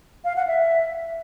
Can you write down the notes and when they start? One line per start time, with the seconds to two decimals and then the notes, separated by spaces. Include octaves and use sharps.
0.25 F5
0.36 F#5
0.47 E5